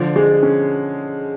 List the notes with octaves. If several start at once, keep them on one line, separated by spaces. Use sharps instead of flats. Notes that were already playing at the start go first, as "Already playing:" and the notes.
Already playing: D3 F3 D5
G#3
C#4